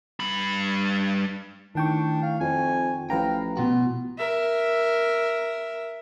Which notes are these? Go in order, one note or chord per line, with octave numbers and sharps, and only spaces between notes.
G2 B5
A2 D#3 D4 G5 C#6
F5
F2 G#5
A1 F3 B4 F5 G5 A#5
B2 F4 F#4
A#4 E5